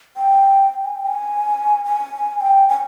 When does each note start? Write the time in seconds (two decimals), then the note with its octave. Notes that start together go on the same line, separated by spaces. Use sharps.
0.16 G5
0.84 G#5
0.95 G5
1.07 G#5
1.85 G#5
2.41 G5
2.69 G#5